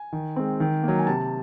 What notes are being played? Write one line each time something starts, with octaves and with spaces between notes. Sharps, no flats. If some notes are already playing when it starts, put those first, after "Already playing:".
Already playing: G#5
D#3
G#3 C4
D#3
F#3 A#3
G#5
C3 A5